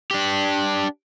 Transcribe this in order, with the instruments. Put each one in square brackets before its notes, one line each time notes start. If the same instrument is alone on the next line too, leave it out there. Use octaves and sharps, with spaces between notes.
[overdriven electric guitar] D4 G4